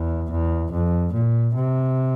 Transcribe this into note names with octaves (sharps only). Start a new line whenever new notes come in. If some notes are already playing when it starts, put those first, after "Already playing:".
Already playing: E2
E2
F2
A#2
C3